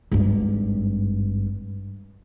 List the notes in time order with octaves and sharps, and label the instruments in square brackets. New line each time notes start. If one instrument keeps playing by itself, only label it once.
[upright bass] G#1 G2